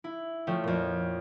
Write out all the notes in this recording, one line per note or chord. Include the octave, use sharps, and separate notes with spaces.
E4
F3 A3 C#4 G5
F2 A#2